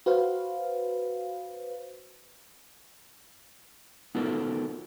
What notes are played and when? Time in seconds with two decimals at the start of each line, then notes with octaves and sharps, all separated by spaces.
0.06 F#4 B4 C5 F5
4.15 B3 D#4 F4 F#4 A4 A#4